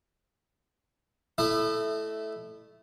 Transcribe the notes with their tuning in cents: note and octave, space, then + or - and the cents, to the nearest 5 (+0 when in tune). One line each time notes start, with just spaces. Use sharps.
A3 -10 E4 +0 D#5 -35